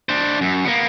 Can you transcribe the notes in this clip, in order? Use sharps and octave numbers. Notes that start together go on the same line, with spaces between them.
D4 C5
F#2
A#3 B3